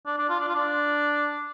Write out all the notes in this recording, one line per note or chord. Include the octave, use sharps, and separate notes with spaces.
D4
D4
F4
D4
F4
D4